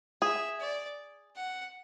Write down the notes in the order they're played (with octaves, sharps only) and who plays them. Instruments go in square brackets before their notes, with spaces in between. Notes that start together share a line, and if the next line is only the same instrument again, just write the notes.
[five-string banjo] G#4 [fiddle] E5
[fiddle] D5
F#5